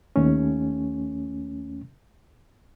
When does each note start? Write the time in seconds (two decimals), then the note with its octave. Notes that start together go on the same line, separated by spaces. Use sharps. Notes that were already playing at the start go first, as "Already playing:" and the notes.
0.16 D#2 A3 C#4